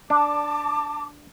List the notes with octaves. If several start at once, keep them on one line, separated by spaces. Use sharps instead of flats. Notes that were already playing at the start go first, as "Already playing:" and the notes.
D4 A5 D6